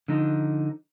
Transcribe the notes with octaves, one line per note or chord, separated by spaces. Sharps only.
D3 F3 D#4